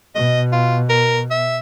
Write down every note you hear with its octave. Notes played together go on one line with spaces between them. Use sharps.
B2 D#5
F4
A#4
E5